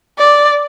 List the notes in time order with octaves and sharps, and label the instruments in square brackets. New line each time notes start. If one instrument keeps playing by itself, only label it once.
[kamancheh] D5